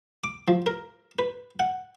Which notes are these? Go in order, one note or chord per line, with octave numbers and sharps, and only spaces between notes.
D6
F3
A#4
B4
F#5